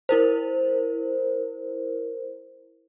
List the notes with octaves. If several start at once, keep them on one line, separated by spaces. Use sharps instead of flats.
E4 A#4 C5